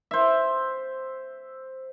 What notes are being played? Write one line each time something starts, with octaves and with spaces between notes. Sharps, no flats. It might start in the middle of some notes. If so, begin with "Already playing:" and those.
C5 E5